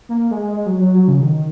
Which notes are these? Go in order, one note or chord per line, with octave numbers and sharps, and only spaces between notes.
A#3
G#3
G#3
F#3
F#3
F#3
C#3
D#3